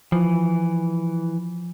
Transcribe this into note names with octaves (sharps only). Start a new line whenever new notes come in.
E3 F3